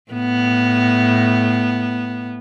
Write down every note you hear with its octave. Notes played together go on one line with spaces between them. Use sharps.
A2 B3